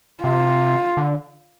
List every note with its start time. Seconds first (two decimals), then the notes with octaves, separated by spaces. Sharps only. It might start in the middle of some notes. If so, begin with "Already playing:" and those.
0.23 C3 F4
0.97 D3